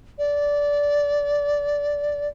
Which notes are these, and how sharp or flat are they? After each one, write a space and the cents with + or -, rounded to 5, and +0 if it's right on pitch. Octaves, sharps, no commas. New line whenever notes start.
D5 -15